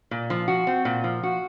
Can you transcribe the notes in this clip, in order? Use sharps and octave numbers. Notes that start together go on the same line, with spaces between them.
A#2
F3
F#4
C4
A#2
F3
F#4